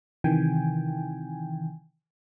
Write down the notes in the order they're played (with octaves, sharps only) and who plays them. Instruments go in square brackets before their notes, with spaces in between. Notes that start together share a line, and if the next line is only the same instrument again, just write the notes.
[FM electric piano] C3 D#3 E3 G5 G#5